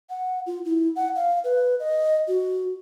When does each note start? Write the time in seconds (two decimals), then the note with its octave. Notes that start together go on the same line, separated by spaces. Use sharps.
0.10 F#5
0.46 F4
0.65 E4
0.96 F#5
1.15 F5
1.44 B4
1.80 D#5
2.28 F#4